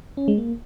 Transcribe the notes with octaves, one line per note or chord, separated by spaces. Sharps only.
C#4
G#3
A#3